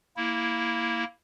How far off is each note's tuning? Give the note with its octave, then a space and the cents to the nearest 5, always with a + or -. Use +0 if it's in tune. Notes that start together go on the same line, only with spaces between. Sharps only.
A#3 +0 E4 -5